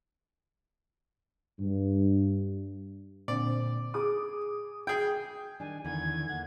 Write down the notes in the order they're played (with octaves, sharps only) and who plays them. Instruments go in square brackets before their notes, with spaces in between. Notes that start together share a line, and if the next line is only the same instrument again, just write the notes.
[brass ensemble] G2
[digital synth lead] A#2 [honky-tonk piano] D3 C4 [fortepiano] D5
[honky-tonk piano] G#4 D6 [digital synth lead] D#6
[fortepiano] G#4 G5 [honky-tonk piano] G6
[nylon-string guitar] D#3 G3 D4 [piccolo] G#5
[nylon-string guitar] E2 D3 D#3 [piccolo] G#6
[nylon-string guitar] A#3 F#5